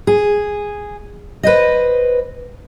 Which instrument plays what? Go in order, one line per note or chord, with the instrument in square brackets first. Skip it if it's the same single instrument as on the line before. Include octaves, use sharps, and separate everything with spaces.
[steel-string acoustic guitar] G#4
B4 C5 D#5